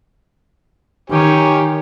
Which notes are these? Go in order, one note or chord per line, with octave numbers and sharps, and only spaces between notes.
D#3 G4 C#5 G#5